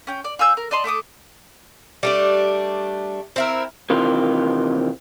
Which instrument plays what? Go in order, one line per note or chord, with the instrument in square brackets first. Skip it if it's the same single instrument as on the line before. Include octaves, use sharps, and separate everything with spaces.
[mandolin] C#4 G5
D5
F4 G#5 E6 G6
A#4
D5 D#5 A5 C6
A3 A4 D6 D#6
[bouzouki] G3 A3 D4
C4 E4 A#4
[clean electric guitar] C3 D#3 E3 C4 F4